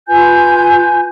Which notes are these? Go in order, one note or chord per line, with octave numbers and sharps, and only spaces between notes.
F4 B4 G#5 G6